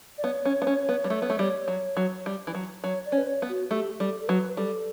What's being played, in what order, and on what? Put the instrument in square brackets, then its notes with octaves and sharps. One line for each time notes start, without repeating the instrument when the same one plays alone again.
[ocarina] D5
[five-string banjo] B3 [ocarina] C#5
[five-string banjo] C#4
B3
C#4
B3
G3
A3
B3
A3
G3
F#3
F#3
G3
E3
F#3
[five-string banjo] F#3 [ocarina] C#5
[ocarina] D5
[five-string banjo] C#4
[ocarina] B4
C#5
[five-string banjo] B3
[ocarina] F#4
[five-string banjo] A3 [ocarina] G4
[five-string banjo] G3 [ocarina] A4
[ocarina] A4
[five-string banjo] F#3 [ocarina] B4
[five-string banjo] G3 [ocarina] A4